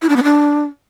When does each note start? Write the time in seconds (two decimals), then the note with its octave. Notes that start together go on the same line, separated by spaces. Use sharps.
0.02 E4
0.09 D4
0.16 B3
0.24 D4